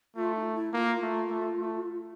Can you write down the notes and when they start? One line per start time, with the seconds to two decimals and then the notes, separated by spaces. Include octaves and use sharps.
0.16 A3 F4
0.35 D#4
0.54 E4
0.73 A#3 F4
1.02 A3
1.30 A3
1.60 A3